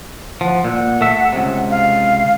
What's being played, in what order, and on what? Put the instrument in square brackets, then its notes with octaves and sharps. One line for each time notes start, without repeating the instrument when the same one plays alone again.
[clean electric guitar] F3 [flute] F#5
[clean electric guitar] A#2 [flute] F#5
[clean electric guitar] A3 E5
C#2 C3
[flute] F5